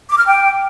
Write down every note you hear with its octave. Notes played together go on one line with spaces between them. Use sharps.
D6
F6
G5